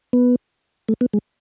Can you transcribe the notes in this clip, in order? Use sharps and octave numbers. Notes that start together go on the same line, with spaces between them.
B3
A3
B3
G#3